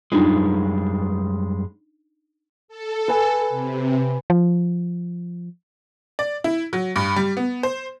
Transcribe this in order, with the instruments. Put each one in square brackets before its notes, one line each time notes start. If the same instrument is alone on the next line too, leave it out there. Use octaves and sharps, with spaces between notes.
[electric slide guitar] F#2 G3 G#3 [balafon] D4 D#4 F4
[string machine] A4
[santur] B4 G#5
[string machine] C3
[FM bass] F3
[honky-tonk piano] D5
E4
F#3
G2
G3
B3
C5